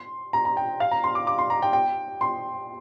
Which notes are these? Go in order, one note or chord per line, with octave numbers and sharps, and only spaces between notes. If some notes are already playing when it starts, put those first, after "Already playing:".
Already playing: C6
A#5
A#5
G5
F5
A#5
C6
D6
D6
C6
A#5
G5
G5
C6